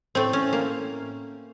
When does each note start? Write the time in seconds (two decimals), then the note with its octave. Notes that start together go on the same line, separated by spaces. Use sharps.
0.15 A2 A3 C4
0.33 C#4
0.53 A#3